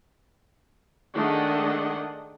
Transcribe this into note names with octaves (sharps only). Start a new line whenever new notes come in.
D#3 A3 D4 G#4 D#5 F#5